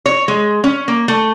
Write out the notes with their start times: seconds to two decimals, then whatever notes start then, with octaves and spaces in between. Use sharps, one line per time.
0.06 C#5
0.28 G#3
0.64 C#4
0.88 A#3
1.08 A3